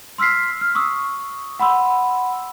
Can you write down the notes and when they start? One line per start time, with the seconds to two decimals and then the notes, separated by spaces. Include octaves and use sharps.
0.18 C6 E6 F6 B6 C7
0.61 F6
0.75 C#6 D#6 E6
1.59 F#5 B5 C6 E6